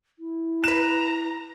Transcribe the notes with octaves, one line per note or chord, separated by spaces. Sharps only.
E4
B4 A#5 F#6 E7